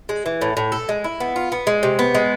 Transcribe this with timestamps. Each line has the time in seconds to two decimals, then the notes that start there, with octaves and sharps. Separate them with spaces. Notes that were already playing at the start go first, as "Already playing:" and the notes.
0.09 G#3
0.26 E3
0.41 A2
0.57 A2
0.72 A4
0.89 G#3
1.04 E4
1.20 B3
1.36 F4
1.52 B3
1.67 G#3
1.83 C3
1.99 B3
2.15 G#3